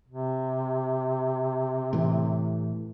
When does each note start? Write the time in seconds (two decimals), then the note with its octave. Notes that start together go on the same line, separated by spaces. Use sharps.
0.08 C3
1.93 A2 E3